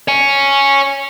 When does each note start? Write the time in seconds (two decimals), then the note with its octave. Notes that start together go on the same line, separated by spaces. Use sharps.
0.08 C#5 G#5